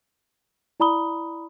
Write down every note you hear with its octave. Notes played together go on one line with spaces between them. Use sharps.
E4 D5 A#5 B5 D#6 G7